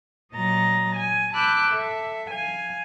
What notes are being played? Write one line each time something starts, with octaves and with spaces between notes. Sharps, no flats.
A#2 F#3 D#5 A#5 A6
G#5
A5 B5 D6 E6 F#6 G6
A4 E5
F5 G#5